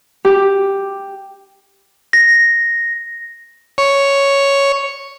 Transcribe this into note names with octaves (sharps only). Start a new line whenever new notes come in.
G4
A#6
C#5